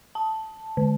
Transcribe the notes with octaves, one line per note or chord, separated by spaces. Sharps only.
A5
D3